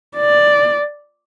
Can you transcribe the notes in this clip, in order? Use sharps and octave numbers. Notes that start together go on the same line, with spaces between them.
D5